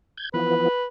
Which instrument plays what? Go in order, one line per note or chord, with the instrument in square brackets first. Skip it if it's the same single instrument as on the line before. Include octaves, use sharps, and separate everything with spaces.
[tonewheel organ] G6 G#6
[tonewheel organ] E3 F3 B3 [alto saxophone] B4